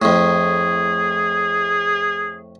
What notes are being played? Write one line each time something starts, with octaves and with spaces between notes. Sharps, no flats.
F2 A2 G#4